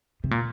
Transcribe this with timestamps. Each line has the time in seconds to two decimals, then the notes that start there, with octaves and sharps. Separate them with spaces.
0.24 C3
0.31 A#2